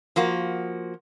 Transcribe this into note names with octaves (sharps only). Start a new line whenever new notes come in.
F3 A#3 F#4